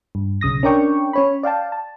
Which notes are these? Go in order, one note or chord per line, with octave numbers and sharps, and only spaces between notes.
G2
B1 C#3 D#6 A#6
C#4 D4 A#4 D5 G5 C#6
C#4 C#5 B5
D5 F5 G5 A5
A5